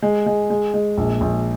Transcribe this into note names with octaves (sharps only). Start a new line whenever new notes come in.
G#3
G#3
G#3
G#3
A#1
A#1